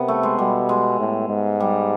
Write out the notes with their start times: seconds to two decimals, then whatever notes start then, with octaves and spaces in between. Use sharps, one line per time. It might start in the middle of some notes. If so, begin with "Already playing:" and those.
Already playing: C3 B3
0.08 A3
0.23 G#3
0.39 B2 G3
0.69 G#3
0.99 A2
1.29 G#2
1.60 G3